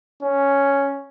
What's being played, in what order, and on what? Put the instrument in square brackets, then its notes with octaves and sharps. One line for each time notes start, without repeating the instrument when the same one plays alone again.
[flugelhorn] C#4